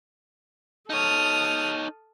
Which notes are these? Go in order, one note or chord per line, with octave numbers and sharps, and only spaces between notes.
D#4 A4 C#5 D#6 F6